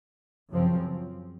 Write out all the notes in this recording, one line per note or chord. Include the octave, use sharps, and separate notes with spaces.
F#2 C#3 F3 C4